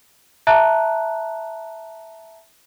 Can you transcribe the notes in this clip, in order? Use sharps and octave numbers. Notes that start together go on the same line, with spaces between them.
E5 A5 A#5 F#6